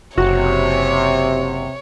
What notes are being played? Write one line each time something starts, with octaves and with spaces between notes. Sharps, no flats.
F#1 C3 F#4 C#5